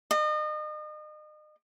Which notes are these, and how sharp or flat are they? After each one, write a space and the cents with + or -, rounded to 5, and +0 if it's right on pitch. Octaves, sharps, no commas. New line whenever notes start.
D#5 -35